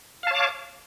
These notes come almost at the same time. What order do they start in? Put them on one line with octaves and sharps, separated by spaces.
F5 A5 C#5 D6